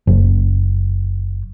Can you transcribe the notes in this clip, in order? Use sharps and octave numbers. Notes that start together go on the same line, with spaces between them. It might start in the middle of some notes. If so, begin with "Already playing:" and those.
F#1